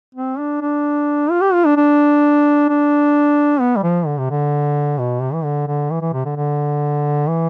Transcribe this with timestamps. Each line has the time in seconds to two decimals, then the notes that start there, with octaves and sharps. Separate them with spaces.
0.15 C4
0.38 D4
0.61 D4
1.31 F4
1.41 G4
1.53 F4
1.65 D4
1.76 D4
2.69 D4
3.60 B3
3.76 G3
3.83 F3
4.06 D3
4.18 C3
4.30 D3
4.99 B2
5.21 C3
5.33 E3
5.44 D3
5.67 D3
5.90 E3
6.01 E3
6.13 C3
6.25 D3
6.36 D3
7.28 E3